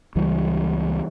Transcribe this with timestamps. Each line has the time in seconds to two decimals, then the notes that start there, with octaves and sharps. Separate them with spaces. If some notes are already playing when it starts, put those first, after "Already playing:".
0.16 C#2 E3 G3